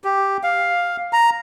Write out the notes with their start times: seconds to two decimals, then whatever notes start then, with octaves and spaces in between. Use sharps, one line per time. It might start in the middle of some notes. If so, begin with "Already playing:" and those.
0.04 G4
0.43 F5
1.13 A#5